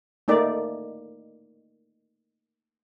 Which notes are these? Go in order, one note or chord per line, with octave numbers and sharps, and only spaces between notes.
A3 A#3 D#4 D5